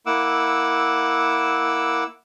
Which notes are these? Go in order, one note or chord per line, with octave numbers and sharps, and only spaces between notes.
A#3 E4 F#5 D6 E6